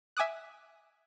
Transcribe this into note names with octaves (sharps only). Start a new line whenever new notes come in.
E5 G#5 D6 D#6 F#6